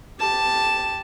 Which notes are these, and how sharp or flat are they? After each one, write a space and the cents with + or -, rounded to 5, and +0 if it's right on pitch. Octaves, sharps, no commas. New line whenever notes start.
G4 +0 A5 +0